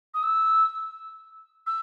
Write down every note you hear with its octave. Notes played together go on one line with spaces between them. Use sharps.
D#6
E6
E6